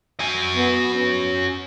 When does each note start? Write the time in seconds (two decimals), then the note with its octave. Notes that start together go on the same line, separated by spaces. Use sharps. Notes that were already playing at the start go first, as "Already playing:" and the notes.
0.20 F#4 G#5
0.55 B3
0.94 C#4